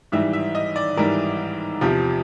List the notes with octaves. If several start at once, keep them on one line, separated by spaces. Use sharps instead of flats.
G#2 E3 G3 E5
E5
D#5
D5
G#2 E3 G3 A#4
E2 C3 F3 G4